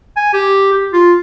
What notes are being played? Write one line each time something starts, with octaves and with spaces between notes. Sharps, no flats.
G#5
G4
G4
F4